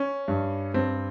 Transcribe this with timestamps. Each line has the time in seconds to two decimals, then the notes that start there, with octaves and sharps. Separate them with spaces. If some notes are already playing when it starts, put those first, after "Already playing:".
Already playing: C#4
0.28 G2
0.74 G2 C4